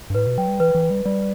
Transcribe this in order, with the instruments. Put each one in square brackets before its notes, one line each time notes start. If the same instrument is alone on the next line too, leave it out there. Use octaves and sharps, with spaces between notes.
[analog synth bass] G2
[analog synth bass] A2 [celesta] B4
[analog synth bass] B2
[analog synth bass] F#3 [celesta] G5
[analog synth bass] G3
[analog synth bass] E3 [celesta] B4
[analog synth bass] E3
[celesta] B4
[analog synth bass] G3
[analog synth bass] G3 [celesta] D5